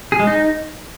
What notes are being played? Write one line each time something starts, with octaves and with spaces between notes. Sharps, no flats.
G#4
G#3
D#4